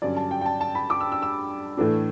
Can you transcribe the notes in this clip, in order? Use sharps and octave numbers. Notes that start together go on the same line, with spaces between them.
G2 D3 F#3 C#4 D5
A5
G5
G5
A5
A5
B5
D6
E6
E6
E6
A2 E3 A3 D4